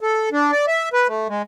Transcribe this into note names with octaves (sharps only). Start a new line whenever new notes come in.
A4
D4
D5
E5
B4
A3
G#3